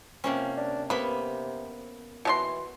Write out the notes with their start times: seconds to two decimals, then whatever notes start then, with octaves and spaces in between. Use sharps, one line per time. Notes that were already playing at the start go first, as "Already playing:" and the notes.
0.24 C3 F3 A#3 C#4
0.57 D4
0.90 C3 A#3 B3 B5
2.25 B2 E3 D#4 C6